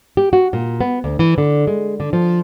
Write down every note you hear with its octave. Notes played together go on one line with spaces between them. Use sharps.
G4
F#4
A#2
B3
D2
E3
D3
G#3
D3
F3